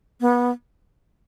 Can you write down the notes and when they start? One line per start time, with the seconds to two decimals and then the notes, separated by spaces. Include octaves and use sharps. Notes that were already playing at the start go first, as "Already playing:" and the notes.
0.21 B3